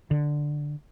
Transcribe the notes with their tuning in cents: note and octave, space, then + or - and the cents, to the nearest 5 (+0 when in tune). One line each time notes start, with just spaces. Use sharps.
D3 +5